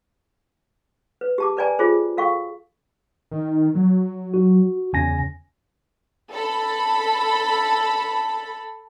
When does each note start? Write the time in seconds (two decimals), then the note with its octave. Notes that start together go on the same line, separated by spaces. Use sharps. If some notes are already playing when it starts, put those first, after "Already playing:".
1.21 B4
1.38 G4 A5 D6
1.57 A#4 B4 D5 G5 G#5 A#5
1.79 F4 G4 G#4 C5
2.17 F#4 A4 F5 G5 C#6
3.31 D#3
3.75 F#3
4.34 F#4
4.93 E2 C#3 G#5 A#6
6.32 A4 B5